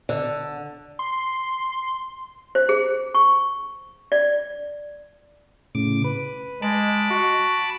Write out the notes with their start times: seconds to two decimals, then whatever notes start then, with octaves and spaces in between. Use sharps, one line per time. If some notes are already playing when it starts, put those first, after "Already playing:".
0.09 D3
0.99 C6
2.55 C5
2.69 G#4
3.15 C#6
4.12 D5
5.75 A2 C#3 D6
6.04 B4
6.62 G#3 A5 B5 D6
7.10 F#4